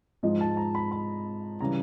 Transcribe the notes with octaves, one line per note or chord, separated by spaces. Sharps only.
G#2 F3 G#3 D#5
A5
A#5
B5
B5
C#3 E3 G3 A#5